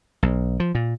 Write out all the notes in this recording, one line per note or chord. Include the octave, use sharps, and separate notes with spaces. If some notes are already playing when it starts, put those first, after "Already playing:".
B1
F3
A#2